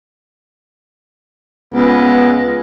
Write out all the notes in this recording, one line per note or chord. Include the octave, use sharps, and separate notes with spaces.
C#2 B3